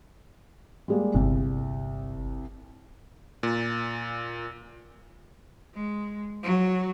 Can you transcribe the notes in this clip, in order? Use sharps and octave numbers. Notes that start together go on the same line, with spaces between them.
G3 G#3 A#3
G1 C2
A#2
G#3
F#3